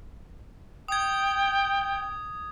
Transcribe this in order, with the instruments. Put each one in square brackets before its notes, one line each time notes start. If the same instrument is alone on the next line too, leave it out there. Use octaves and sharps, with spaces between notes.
[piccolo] G5 [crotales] D#6 G#6